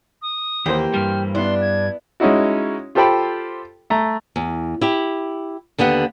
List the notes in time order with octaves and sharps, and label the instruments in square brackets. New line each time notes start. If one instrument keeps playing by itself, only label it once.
[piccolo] D#6
[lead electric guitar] D#2 [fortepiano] E3 A#3 C5 [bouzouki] G4
[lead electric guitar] G2 G3 [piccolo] F6
[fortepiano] B3 E4 [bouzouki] D4 [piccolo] C6
[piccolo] G#6
[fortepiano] G#3 C#4 D#4 E4 F#4
F4 G4 A4 C5 G5 B5
A3 A#5
[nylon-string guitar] E2
E4 G4
D#2 D3 B3 G4 F#5